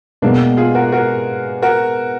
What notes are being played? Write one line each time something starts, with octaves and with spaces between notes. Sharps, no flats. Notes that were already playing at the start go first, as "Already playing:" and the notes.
B2 G#3 A#3 B3 D4
F4 G#4
F#4 A#4
F#4 A#4
F#4 A#4